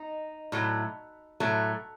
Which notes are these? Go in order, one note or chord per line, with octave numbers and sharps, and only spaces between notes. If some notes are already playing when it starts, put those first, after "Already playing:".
Already playing: D#4
A2 F#3 A3
A2 F#3 A3